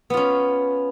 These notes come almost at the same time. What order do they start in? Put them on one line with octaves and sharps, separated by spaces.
B3 F4 C#4